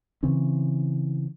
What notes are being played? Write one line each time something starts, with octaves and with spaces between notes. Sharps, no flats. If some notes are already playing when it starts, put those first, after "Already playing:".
C#3 E3 C4 C#4